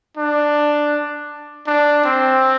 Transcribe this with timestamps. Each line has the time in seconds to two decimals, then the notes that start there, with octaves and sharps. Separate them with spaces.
0.17 D4
1.67 D4
2.04 C4